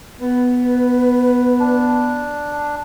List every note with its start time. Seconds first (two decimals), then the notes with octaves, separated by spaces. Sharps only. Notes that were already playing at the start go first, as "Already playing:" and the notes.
0.20 B3 B4
1.60 D4